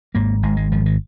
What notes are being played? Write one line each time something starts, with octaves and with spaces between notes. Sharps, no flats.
G#1 G#2 A#3
G#1 G#2 G#3
G#3
G#1 G#2 F3
D#3